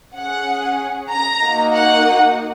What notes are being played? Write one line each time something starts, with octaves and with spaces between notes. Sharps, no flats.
C#4 G#4 F#5
A#5
A#3 D#4 F#4
F#5